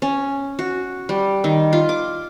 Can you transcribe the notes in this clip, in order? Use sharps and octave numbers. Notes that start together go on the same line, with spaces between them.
C#4
F#4
G3
D#3
F4
D6